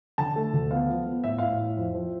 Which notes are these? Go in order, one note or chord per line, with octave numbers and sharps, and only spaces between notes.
D3 A5
A3
D2
B3 F5
F3
B3
A2 E5
A2 F5
E5
E3
F2
F3